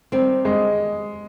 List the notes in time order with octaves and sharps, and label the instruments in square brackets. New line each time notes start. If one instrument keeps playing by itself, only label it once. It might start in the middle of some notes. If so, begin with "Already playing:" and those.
[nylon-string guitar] D#3 G3 C4
[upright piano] G#3